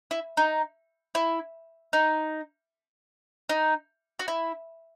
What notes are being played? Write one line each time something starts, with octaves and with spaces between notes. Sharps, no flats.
E4
D#4
E4
D#4
D#4
F#4
E4